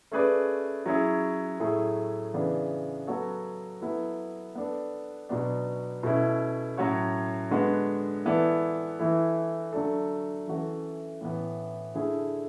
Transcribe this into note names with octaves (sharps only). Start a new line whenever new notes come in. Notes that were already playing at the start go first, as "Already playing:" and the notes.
A3 C#4 G#4 B4 D5
F#3 C#4 E4 G#4
A2 F#3 A3 E4 G#4
C#3 E3 B3 D4 G#4
F#3 B3 F#4 A4 C#5
F#3 B3 E4 A4
B3 D4 A4
B2 F#3 B3 D4
B2 A3 C#4 E4
A2 F#3 C#4 F#4 C#5
D3 G#3 B3 F#4
E3 B3 E4 A4 D5
E3 A3 E4
D3 F#3 A3 D4 A4
E3 A3 C#4 F#4 A4
A2 E3 B3
D3 A3 E4 G#4